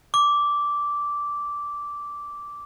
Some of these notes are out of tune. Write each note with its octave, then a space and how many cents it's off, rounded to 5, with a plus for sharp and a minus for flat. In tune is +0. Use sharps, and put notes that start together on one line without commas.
D6 -10